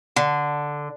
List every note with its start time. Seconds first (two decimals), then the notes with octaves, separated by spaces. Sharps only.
0.16 D3